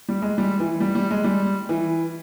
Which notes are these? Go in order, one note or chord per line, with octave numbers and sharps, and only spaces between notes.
G3
G#3
G3
E3
G3
G3
G#3
G3
E3